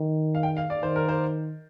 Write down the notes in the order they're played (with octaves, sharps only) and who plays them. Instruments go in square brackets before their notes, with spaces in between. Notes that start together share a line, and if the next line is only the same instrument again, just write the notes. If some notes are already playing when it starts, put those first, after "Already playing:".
Already playing: [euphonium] D#3
[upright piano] F5
G5
F5
D5
[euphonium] D#3 [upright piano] C5
[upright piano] A#4
C5